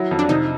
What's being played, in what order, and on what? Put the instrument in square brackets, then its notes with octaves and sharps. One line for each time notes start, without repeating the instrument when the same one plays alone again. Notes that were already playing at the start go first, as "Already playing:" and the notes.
Already playing: [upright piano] F#3 [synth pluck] E4
[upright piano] F2
[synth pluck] D4
[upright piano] C3 [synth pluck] D#4